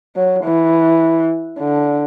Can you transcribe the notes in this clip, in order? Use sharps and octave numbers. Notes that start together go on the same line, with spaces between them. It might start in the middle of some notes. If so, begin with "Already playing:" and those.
F#3
E3
D3